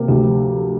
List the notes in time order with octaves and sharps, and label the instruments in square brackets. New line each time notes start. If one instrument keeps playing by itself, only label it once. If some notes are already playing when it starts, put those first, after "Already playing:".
Already playing: [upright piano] C3 A#3 [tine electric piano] A#4
[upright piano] D2 [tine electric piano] G4
[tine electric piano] F3